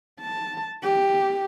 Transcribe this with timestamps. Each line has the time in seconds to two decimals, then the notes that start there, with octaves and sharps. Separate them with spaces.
0.20 A5
0.83 G4